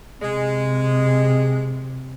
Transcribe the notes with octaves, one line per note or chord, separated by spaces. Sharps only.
C3 G#3